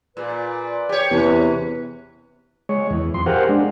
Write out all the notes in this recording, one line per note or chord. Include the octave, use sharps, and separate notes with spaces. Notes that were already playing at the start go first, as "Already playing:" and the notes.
A#2 G#4 B4 D5
G4 C#5
E2 C3 C#4 B4
G#3 C#5
E2
F2 C6
G4 G#4 A#4 C5 F5 F#5
G#3 D4